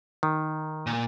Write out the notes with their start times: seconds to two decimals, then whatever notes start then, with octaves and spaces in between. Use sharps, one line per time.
0.23 D#3
0.87 A#2